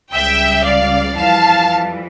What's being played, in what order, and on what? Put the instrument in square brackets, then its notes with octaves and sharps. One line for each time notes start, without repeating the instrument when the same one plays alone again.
[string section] C#2 C#3 G3 E5 G5
D5 F5
F2 E3 G3 F5 A5